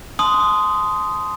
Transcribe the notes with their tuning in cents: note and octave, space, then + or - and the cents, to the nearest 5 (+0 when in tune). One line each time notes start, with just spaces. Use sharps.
A5 -40 C6 -15 D#6 +0